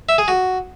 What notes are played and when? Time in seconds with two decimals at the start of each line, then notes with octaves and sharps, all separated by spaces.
0.09 E5
0.18 G#4
0.28 F#4